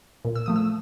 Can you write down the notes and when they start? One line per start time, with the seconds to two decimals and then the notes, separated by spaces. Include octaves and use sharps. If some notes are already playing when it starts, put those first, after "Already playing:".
0.24 A#2
0.36 E6
0.46 F3 A3 D#6
0.56 E6